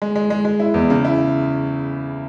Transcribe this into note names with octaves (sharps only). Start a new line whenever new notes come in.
G#3
G#3
G#3
G#3
E4
E2
C#3
E4